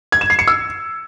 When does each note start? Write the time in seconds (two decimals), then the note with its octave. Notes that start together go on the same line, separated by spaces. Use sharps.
0.12 G#6
0.21 E7
0.30 C7
0.39 C#7
0.47 E6